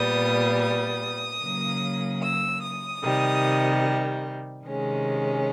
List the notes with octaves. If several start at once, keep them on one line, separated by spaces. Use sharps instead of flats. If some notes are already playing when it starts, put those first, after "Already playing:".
Already playing: A#2 G3 B3 D#6
D#6
C#3 F#3 A#3
E6
D#6
C3 D#3 G3
C3 D#3 G#3 C#4